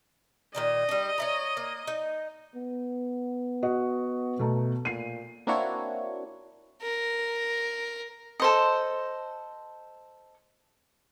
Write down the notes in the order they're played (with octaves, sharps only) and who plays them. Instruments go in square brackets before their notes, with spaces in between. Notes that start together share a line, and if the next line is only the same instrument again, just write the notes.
[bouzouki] A#2 D#3 D5 [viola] D#5
[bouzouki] G3 D4
C#5 E5 A#5
A#3
D#4
[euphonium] B3
[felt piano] F#4 D#5
B2 A3 A#5
[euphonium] A#2 [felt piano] C7 D#7
[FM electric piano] A#3 C4 D4 E4 F#4 C#5
[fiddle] A#4
[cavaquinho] A4 C5 D#5